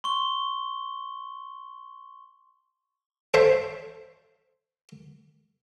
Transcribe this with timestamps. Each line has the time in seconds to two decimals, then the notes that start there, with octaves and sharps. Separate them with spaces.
0.04 C6 C#6 G7
3.34 A4 C5 C#5 E5